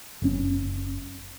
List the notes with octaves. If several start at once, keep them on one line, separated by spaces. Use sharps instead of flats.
F#1 A2 C#4